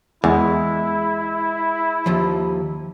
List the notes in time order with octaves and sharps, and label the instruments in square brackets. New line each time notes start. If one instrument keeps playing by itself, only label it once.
[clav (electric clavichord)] E2 [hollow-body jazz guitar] G#3 [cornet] E4
[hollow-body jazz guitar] D#2 F3